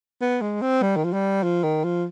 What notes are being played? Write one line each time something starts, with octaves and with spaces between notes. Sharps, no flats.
B3
G#3
C4
G3
D#3
F3
G3
F3
D#3
F3